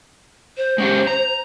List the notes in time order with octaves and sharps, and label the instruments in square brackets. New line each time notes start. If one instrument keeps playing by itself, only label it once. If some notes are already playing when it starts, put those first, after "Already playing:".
[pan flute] C5
[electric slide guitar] G#3 C#4 G4
A#5